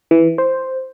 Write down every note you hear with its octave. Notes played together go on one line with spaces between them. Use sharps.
E3
C5